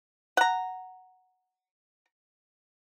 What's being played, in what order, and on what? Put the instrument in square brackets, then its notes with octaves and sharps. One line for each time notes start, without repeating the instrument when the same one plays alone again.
[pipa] F#5 A#5